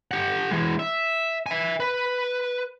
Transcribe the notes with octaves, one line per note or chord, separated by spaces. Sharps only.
G4 F#5
E3 G#3
E5
E5 G#5
B4